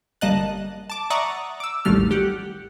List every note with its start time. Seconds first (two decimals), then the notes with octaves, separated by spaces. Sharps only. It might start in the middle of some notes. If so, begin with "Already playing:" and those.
0.21 G1 G3 A#3 D#5 A5 F#6
0.90 A5 D6
1.10 D5 E5 F#5 A#5 C#6 D#6
1.60 D6 E6
1.85 A1 D#2 F#3 G3 A3 F6
2.11 G4 F#5